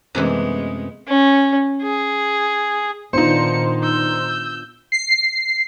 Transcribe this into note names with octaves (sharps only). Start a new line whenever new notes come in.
F#2 C3 E3 G#3 A3 B3
C#4
G#4
A#2 D#3 B3 D4 D#4 F4 C5 C#7
E6 G6
C7